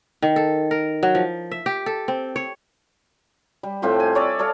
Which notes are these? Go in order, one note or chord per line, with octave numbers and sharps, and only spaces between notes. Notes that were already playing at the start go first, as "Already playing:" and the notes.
D#3
A4
A#4
F#3
F3
E5
G4
A4
C4
C#5
G3
A2 C4 F4 G4
G#5
C#5 D5 E5
A4 C#5 D5 F5